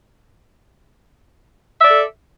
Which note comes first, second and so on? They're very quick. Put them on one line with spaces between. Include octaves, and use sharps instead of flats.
E5 D5 A4